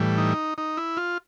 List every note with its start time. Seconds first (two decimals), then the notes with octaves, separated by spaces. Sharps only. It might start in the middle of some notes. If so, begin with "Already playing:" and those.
Already playing: A2 E3 G3
0.18 D#4
0.58 D#4
0.77 E4
0.97 F4